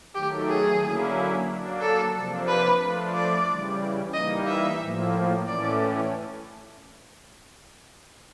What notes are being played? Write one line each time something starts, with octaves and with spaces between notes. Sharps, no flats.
D#3 F#3 A3 G4
G#4
D3 F#3 A#3 C#4 E4
F#3 A#3 D4
A4
C3 F3 A#3 D4
B4
F3 A3 D4 F4
D5
C#3 E3 G3
E3 G3 A#3 D#4 D#5
E5
A2 F3 A#3
A2 E3 A3 C#4 D5